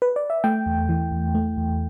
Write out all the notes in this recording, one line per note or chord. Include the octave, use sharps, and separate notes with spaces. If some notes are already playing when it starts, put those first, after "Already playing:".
B4
D5
E5
A3 G5
E2
E3
E2
A3
E2